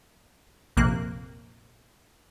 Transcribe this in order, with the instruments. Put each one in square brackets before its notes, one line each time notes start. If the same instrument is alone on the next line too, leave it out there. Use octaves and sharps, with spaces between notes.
[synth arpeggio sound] A#1 F2 C3 A#3 F#6